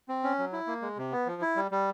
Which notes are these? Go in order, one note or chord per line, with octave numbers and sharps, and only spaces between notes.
C4
C#4
F#3
E4
A#3
G#3
C3
B3
F3
E4
G3
G3